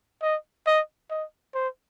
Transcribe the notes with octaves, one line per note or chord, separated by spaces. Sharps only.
D#5
D#5
D#5
C5